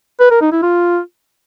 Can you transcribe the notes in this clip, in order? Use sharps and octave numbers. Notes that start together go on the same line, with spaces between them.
B4
A#4
D#4
E4
F4